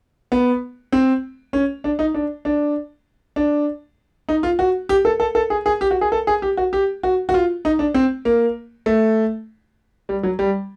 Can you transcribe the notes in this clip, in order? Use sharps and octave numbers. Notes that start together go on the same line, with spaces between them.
B3
C4
C#4
D4
D#4
D4
D4
D4
D#4
F4
F#4
G4
A4
A4
A4
G#4
G#4
G4
F#4
G#4
A4
G#4
G4
F#4
G4
F#4
F#4
F4
D#4
D4
C4
A#3
A3
G3
F#3
G3